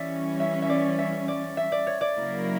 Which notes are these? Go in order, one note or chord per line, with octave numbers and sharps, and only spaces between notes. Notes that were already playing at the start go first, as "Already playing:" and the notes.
Already playing: E3 G3 C#4 D5 E5
E5
E5
D5
E5
D5
E5
D5
C#5
D5
C#3 F#3 A#3 E4 A#4